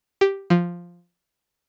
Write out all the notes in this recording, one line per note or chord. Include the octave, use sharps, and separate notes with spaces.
G4
F3